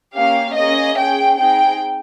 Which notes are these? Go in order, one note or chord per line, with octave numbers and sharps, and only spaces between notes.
A#3 C#4 G4 F5
A#3 C#4 G#4 D#5
C#4 G#4 G5
C4 D#4 G#4 G5